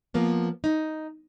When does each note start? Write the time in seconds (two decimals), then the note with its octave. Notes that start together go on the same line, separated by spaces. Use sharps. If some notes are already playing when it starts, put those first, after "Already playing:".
0.14 F3 A#3 B3
0.64 D#4